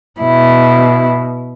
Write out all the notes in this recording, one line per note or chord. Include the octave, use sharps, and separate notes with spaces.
B2 E4